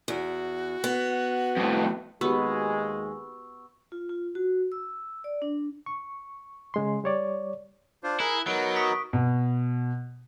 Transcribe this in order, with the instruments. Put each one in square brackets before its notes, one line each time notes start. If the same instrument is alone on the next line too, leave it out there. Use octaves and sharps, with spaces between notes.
[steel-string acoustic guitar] E2 [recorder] F#4
[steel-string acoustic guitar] B3
[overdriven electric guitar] F2 A2
[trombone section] D#2 G#3 [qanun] B3 [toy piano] F#4 G4 [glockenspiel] C#6 E6
[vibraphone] F4
F4
F#4
E6
D5
D4
[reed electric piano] C#6
C#3 G#3 C6
G3 C#5 D5
[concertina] D4 F4 C5
[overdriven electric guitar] E4 [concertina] G#4 A#4 [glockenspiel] F#6
[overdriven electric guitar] F#3 [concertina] B3 D#4 A#4 [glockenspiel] D7
[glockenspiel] C#6 D#6 B6
[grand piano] B2